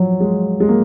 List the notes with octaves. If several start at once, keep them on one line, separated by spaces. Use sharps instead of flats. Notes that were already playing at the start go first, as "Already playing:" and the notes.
Already playing: F3 F#3
G#3
G#3
A#3